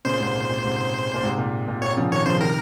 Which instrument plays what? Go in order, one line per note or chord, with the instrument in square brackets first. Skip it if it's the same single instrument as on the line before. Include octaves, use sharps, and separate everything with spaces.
[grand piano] A#2 C#3 [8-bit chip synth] C5
[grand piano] G#2 C3
A#2
A#2
G#2 C3
A#2
G#2 C3
A#2
A#2
[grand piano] A#2 [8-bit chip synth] C#5
[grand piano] C#3 F3
[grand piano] C3 D#3 [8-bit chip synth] C#5
[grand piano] C#3 F3 [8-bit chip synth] C5
[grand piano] C3 D#3 [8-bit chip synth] A#4